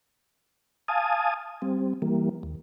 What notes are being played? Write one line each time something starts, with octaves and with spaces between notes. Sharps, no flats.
F5 G#5 A5 D#6
G3 C4
E3 G3 A#3
D#2